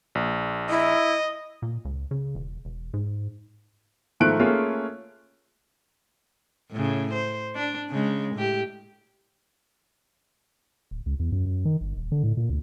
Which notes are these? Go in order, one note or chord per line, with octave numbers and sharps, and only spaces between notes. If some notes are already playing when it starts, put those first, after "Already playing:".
A#1
E4 D#5
A#2
C#2
C#3
E1
E1
G#2
G#2 D#3 F3 A3 F#6 D7
A3 A#3 C#4 F4 G#4
A2 C#3
C5
D4
C#3 G#3
A2 G4
D1
C#2
E2
F#2
F#2
D#3
G1
D#1
D3
A2
A#2
D2